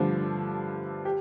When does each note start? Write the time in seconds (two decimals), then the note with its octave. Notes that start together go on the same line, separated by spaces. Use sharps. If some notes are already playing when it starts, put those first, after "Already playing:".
Already playing: G2 D3 F3 A3
1.05 G4